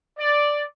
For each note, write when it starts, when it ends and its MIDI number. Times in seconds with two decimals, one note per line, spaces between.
0.18 0.65 74